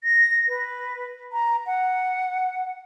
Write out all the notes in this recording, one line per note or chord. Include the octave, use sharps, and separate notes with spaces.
A#6
B4
A#5
F#5